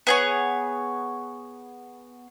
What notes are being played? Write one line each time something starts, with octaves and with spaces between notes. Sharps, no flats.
B3 G#4 C#5